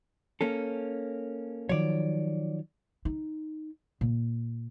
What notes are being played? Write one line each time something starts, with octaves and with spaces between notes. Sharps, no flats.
A#3 C#4 A4
D#3 F3 F#3 C#5 D5
D#4
A#2